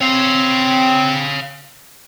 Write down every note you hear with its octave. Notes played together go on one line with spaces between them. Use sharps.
C4 C#5 F5